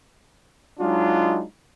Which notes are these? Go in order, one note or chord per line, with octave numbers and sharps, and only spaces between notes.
F#3 G#3 D4 D#4 F4